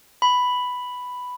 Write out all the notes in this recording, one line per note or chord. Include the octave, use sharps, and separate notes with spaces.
B5